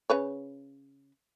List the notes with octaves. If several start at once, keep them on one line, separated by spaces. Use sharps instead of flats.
C#3 B4 C#5